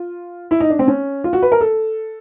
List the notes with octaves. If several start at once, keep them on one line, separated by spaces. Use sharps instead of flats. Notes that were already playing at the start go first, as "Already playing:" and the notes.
Already playing: F4
E4
D#4
D4
C4
C#4
F4
F#4
B4
A#4
A4